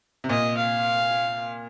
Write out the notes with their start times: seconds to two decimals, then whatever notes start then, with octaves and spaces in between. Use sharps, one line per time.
0.24 C3
0.29 A#2 D#5
0.58 F5